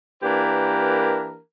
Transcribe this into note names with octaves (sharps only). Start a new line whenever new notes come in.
E3 A#3 D4 G4 A#4 B4